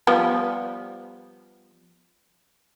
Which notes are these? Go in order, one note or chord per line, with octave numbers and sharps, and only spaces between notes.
F3 G3 B3